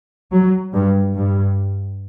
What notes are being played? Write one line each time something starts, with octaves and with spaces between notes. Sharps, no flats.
F#3
G2
G2